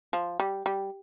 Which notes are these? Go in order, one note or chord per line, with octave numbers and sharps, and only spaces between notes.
F3
G3
G3